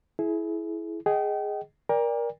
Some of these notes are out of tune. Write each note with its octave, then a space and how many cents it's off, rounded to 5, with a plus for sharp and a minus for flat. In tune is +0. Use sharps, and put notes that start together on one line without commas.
E4 +0 G#4 +30
G#4 +0 D#5 +0 G5 -35
A#4 +20 D5 +0 G5 +40